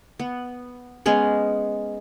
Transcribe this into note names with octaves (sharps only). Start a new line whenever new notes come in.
B3
G#3 B3 C#4 G#4